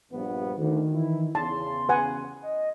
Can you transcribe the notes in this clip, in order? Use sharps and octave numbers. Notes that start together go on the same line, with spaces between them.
A#1 G2 B3
D2 D#3
E3 E4
E2 C#3 A5 C6
B4 F#5 G#5
D#5